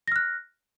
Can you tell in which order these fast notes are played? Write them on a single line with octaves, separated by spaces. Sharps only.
A#6 F6 F#6